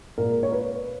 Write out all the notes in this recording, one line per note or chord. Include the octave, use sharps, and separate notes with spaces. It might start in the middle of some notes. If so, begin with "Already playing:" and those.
A#2 G#3 A#4
C#5
B4